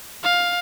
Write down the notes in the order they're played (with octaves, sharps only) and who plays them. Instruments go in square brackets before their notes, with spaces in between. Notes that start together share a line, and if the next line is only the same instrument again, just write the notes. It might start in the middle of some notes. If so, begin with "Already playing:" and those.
[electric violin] F5